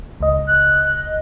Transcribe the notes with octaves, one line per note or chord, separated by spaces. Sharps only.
C#2 D#5
F#6